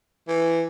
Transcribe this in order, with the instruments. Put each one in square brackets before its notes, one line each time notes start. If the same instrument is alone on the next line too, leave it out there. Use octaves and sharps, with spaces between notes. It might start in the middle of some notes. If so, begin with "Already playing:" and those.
[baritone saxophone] E3